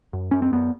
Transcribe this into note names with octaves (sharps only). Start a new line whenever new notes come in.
F#2
F#2 C#4
C4
F#2 B3